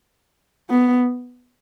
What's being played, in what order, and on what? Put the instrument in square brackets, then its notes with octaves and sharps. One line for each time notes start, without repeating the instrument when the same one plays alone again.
[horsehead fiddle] B3